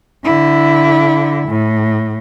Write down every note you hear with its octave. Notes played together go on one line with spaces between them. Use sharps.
D3 E4
A2